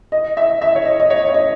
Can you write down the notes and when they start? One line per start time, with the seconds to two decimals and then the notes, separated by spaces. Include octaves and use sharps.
0.12 D#5
0.37 E5
0.62 E5
0.76 C#5
0.86 D#5
1.00 D#5
1.10 C#5
1.28 C#5
1.34 D#5